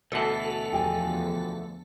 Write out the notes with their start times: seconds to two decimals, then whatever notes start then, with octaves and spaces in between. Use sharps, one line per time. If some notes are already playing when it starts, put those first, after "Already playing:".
0.12 D2 B2 E3 A4 A5
0.73 E2 D3 F3 G4 G#5